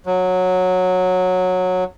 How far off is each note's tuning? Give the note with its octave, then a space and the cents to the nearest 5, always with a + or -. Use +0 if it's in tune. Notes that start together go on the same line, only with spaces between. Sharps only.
F#3 -10